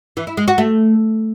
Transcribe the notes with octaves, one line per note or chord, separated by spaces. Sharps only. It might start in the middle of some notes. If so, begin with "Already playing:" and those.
E3
E4
G#3
F#4
A3